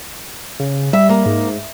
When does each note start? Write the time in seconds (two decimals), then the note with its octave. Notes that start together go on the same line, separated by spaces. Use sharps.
0.60 C#3
0.93 G3 E5
1.09 A#3
1.26 G#2